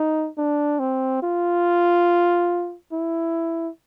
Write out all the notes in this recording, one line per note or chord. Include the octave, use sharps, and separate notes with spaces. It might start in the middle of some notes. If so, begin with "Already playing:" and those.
Already playing: D#4
D4
C4
F4
E4